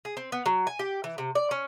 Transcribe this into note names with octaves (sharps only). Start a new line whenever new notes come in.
G#4
C4
B3
F#3
G#5
G4
E3
C3
D5
C#4